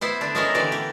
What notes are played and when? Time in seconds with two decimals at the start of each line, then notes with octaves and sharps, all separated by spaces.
0.01 B3 E4 C5
0.21 D3 D4
0.35 G#3 B3 C#4 E4 A4 A#4
0.54 D3 E3 G4 D5
0.72 G4